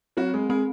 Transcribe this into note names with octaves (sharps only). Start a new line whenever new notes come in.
F#3 C4 F#4
G#3 G#4
G#3 C4 G#4